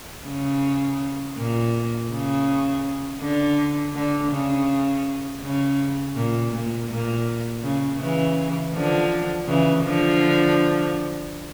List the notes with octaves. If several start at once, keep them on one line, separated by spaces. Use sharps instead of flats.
C#3
A#2
C#3
D3
D3
C#3
C#3
A#2
A#2
A#2
C#3
C#3 E3
D3 F3
C#3 E3
D3 F3